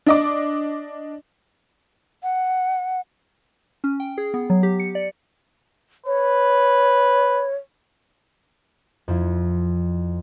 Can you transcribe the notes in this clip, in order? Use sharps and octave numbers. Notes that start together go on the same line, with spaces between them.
D4 D#5 D6
F#5
C#4
G5
G#4
B3
F#3
G4
C#7
D5
B4 C#5
F2 F3 E4